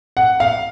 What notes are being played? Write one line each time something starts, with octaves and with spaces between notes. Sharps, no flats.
F#5
F5